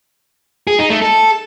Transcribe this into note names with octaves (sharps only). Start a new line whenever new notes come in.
G#4
D#4
A3
A4